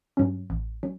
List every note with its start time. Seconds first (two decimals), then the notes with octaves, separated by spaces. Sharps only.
0.17 G2 F#3 C#4
0.50 A1
0.83 F#3 C#4